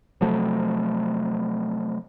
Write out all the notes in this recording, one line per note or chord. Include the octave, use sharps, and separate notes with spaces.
C3 F3 F#3 A3